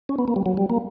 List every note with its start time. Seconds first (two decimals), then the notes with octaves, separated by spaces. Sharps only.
0.09 C#4
0.19 B3
0.28 A#3
0.36 G3
0.46 F#3
0.57 G3
0.70 A#3